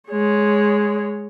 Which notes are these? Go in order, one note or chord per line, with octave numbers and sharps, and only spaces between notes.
G#3 C#5